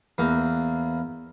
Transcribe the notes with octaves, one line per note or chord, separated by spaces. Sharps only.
E2 A#3